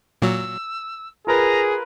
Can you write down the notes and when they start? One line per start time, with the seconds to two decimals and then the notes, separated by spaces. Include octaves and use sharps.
0.22 A#2 F#3 E6
1.27 F4 G#4 A#4 B4 A#5